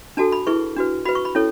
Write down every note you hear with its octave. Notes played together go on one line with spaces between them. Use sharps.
D4 F#4 A4 A5
B5
E4 G#4 B4 C#6
D4 F#4 B4
F#4 B4 B5
C#6
B5
C#4 E4 A4 C#5